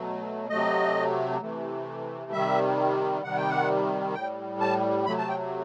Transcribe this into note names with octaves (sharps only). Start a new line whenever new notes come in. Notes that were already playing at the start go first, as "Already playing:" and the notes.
Already playing: B2 F#3 A3
C3 F#3 A3 D#5
C3 E3 A3
C3 D#3 G3 E5
C3 D#3 G3 F#5
G5
F#5
A2 G3 G5
A5
C3 F#3 A3 B5
A5
G5